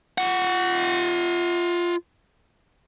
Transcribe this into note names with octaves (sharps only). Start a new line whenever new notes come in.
F4 F#5